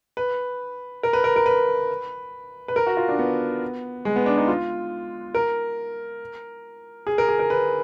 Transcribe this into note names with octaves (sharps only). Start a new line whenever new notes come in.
B4
A#4
B4
A#4
A#4
B4
B4
A#4
F#4
F4
D4
B3
G#3
B3
D4
D#4
F4
A#4
G#4
A#4
G#4
A#4
B4